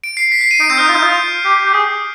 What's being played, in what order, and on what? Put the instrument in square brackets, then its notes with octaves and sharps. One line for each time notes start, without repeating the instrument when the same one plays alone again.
[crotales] D7
C7
B6
C7
D#7
[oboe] D#4 [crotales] D7
[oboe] C4 [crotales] G6
[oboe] D#4 [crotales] F6
[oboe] F4 [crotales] G6
[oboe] D#4
F4
G4
G4
G#4